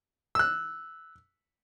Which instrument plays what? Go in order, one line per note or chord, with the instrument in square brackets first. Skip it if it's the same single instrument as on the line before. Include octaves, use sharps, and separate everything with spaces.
[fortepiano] E6 F#6